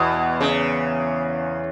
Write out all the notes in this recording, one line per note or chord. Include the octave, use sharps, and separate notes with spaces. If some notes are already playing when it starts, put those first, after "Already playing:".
Already playing: E2 B2 E3
C#3